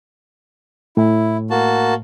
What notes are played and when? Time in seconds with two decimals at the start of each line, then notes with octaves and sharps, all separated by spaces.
0.97 A2 E4
1.50 A#3 F#4 A5